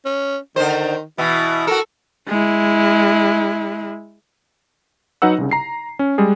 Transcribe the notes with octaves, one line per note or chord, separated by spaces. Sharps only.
C#4
D3 D#3 C5
B2 E3 E4
F#4 A4 A#4
G#3 E4
F#3 D#4 B4 F#5 E6
C2 C#3
A#5 C7
C#4
G3 G#3 G#4